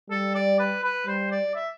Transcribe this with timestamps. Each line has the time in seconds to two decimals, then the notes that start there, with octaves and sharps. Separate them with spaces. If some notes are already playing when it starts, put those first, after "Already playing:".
0.10 G3 A4
0.35 D5
0.59 B4
0.83 B4
1.06 G3 C5
1.31 D5
1.55 E5